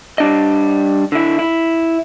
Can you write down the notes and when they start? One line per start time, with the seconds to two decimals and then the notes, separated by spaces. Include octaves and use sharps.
0.18 G3 D4 D#5
1.12 D3 E4
1.39 E4